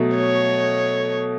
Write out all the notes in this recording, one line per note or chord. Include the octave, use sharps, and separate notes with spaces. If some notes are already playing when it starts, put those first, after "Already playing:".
Already playing: B2 F#3 A3
C#5